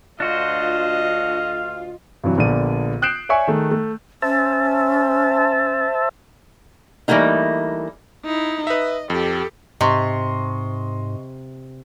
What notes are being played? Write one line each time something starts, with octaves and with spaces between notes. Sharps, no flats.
D2 D4 F4 F#4 C5 D#5 F5
G2 C3 E3 F#3
A#1 D3 A#3 B3 D5 D#7
D#6 F#6 G6 C7 D7 E7
C#5 D5 E5 G#5 C#6
D#3 A3 G#4
A3
C#4 C5 E5 A5
E3 G3 A3 A#3 D#4
D#4 E4
B4 D#5 E5
F2 G4 A4
G#2 C3 D#5 C6 C#6